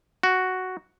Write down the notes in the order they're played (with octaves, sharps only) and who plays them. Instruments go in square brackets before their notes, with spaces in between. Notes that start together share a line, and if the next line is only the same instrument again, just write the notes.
[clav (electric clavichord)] F#4